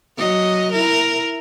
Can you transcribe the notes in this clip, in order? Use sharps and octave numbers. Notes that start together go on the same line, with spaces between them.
F#3 D#5
E4 A#4